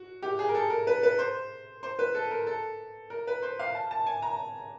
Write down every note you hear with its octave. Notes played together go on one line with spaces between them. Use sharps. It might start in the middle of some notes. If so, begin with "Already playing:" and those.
Already playing: F#4
G4
G#4
A#4
A4
A#4
B4
B4
C5
C5
B4
A4
A#4
A4
A#4
B4
C5
F5
A5
A5
G#5
A#5